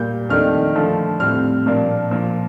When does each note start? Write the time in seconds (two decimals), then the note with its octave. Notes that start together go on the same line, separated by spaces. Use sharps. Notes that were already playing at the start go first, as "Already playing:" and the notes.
Already playing: A#2 G3 A#3 G6
0.29 F2 D#3 A3 D4 F6
0.75 D3 F3 A3
1.20 A2 G3 C4 F6
1.66 A#2 F3 A#3 D4
2.11 A#2 F3 A#3